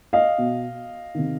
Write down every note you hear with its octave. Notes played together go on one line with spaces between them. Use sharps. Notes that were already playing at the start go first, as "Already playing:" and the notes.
D#5 F5
B2
C3 D#3